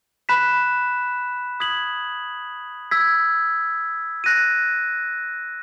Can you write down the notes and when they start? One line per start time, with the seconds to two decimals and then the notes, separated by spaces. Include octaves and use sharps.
0.29 B5 F#6 B6 E7
1.60 D#6 G#6 B6 F#7
2.91 E6 G#6 B6
4.24 F#6 A#6 D#7